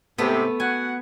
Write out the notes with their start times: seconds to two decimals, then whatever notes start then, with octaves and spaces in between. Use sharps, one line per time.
0.18 G#2 C3 A3 B3
0.60 F#4 F#5 G#5